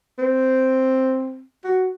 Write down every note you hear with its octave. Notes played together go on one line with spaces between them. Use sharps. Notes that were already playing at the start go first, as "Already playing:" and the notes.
C4
F#4